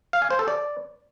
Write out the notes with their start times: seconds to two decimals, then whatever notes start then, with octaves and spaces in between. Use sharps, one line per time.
0.13 F5
0.22 G#5
0.30 C5
0.39 A4
0.48 D5